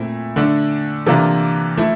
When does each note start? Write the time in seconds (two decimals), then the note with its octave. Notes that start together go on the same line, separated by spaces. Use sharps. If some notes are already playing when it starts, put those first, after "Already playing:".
Already playing: A#2 A3 C4 E4
0.36 D3 A3 D4
1.06 C3 E3 A#3 D4 F4 A4
1.77 F3 A3 E4